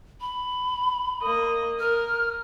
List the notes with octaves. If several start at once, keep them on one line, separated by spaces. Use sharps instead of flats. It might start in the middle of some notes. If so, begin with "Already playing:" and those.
B5
A#3 D#5
A#4 F6